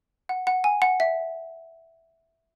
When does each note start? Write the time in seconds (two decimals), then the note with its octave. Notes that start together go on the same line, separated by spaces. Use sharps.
0.29 F#5
0.47 F#5
0.64 G#5
0.82 F#5
1.00 E5